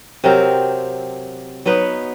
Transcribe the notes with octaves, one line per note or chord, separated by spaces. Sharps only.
C3 F#3 C4 A#4
F#3 B3 D#4 B4